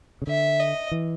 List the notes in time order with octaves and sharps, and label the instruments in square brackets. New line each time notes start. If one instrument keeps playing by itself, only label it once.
[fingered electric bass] C#3
[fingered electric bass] D3 [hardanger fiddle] E5
[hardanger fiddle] D#5
[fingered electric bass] E3